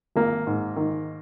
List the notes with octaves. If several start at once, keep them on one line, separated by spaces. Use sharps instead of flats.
G#1 A#3
G#2
D#3